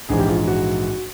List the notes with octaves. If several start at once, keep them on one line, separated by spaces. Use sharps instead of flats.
A#1 G#2 E3 G#4
G4
F4
F#4